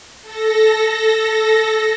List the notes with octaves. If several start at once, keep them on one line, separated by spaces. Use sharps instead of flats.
A4 A#6